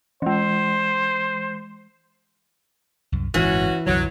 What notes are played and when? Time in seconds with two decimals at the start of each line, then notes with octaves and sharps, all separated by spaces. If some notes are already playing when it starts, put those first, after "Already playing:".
0.22 E3 G#3 C5
3.12 C2 F#2
3.34 D1 G1 E3 G#3 C#4 F#4
3.87 C2 F#2 D3 F#3